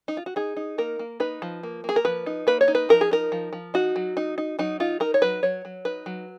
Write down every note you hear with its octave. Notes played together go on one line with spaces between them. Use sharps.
D#4
F4
F#4
D#4 G#4
D#4
A#3 A#4
A#3
D#4 B4
F3
A#3
A#3 G#4
A#4
F3 B4
D#4
A#3 B4
C#5
D#4
B4
F3 A#4
G#4
D#4 A#4
F3
F3
D#4 F#4
F#3
D#4
D#4
F#3 D#4
D#4 F4
D#4 A#4
C#5
F#3 B4
F#3 C#5
F#3
D#4 B4
F#3